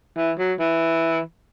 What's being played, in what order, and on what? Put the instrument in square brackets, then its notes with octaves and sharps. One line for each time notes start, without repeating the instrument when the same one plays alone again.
[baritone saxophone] E3
F#3
E3